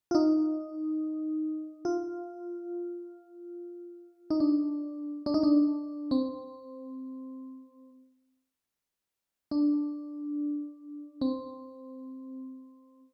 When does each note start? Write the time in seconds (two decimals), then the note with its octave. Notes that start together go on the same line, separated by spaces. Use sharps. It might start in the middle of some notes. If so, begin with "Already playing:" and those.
0.11 F4
0.15 D#4
1.85 F4
4.30 D#4
4.40 D4
5.26 D4
5.34 D#4
5.43 D4
6.11 C4
9.51 D4
11.21 C4